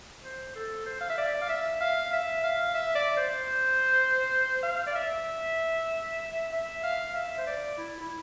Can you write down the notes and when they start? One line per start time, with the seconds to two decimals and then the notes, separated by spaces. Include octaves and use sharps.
0.24 C5
0.55 A4
0.86 C5
1.01 F5
1.10 E5
1.18 D5
1.42 F5
1.49 E5
1.80 F5
2.12 E5
2.44 F5
2.74 E5
2.95 D5
3.17 C5
4.63 F5
4.87 D5
4.95 E5
6.52 E5
6.83 F5
7.15 E5
7.38 C5
7.47 D5
7.78 E4
8.00 E4